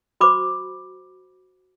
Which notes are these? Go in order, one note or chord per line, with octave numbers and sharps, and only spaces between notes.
F#4 C5 B5 D6